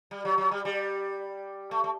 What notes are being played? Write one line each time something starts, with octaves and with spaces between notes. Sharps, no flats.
G3
F#3
F#3
G3
G3
A3
A3